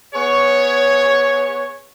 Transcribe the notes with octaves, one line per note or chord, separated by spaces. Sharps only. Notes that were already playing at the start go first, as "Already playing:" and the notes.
B3 G#4 C#5